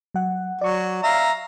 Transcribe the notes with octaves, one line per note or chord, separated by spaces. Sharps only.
F#3 F#5
F#3 D5 C#6
E5 F5 A#5